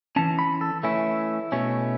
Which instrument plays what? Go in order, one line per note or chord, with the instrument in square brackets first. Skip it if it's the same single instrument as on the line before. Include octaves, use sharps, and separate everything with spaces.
[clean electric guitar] E3 C#4 A5
B5
A4
E3 A3 C#4 E4
B2 A3 C#4